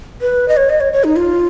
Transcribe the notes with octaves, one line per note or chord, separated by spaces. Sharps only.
B4
D#5
C#5
D#5
C#5
C#5
D#4
F4